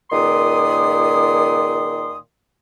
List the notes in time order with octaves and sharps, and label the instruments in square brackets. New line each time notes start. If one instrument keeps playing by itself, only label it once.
[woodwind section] C#2 A#2 D#3 C6 D#6